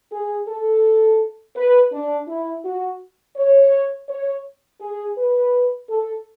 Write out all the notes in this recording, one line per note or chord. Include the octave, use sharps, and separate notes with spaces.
G#4
A4
B4
D4
E4
F#4
C#5
C#5
G#4
B4
A4